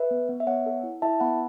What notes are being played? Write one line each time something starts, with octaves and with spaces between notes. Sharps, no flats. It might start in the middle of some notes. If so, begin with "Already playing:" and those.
Already playing: B4 E5
B3
B3
E5
B3 C#5 F#5
A4
E4
E4 E5 A5
B3 F#5 B5